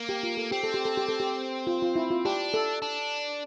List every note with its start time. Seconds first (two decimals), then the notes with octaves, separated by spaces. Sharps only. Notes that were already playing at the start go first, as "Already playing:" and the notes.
Already playing: A#3
0.09 G4
0.23 F4
0.37 A4
0.51 C4 G4
0.64 A4
0.74 G4
0.85 A4
0.97 G4
1.09 A4
1.20 G4
1.67 F4
1.82 F4
1.96 E4
2.11 F4
2.25 D4 G4
2.54 A4
2.82 D4